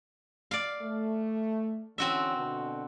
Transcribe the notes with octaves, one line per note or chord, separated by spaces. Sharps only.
D5 F5
A3
D3 E3 C4 C#4 F#4 E5
B2 D3